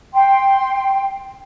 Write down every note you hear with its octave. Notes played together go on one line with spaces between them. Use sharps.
G5 C6